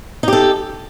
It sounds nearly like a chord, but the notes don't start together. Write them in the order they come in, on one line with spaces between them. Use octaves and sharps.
D#4 G4 A4